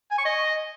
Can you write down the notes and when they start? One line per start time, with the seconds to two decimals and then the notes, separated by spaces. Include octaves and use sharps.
0.11 G#5
0.18 C#6
0.25 D#5